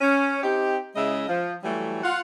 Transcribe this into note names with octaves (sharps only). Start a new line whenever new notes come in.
C#4
C4 D#4 G4
C#3 G#3 E4 D#5 E5
F3
E3 F#3 G3 A3
F4 F#5